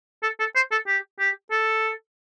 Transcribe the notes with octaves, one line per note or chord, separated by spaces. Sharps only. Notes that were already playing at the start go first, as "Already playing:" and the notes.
A4
A4
C5
A4
G4
G4
A4